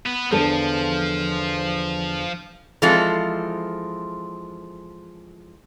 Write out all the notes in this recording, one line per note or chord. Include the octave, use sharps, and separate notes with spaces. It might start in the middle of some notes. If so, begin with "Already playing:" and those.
B3
E2 D3 F3 A4
E3 F3 G#3 C4 F4 A4